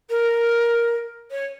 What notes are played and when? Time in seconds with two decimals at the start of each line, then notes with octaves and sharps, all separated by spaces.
0.09 A#4
1.31 C#5